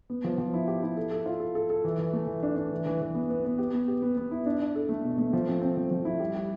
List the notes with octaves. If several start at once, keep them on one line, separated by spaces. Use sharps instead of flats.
B3
F3
F3
E4
G4
E4
A4
A4
F4
A4
A4
A4
E3
E3
A3
E3
D4
D4
E3
E3
E3
B3
B3
B3
G4
B3
G4
B3
B3
E4
D4
D4
A4
A3
B2
A3
F3
C4
C4
F3
F3
E4
G3
G3